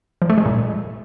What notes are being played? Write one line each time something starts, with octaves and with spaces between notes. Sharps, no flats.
F3
A3
G#3
A#2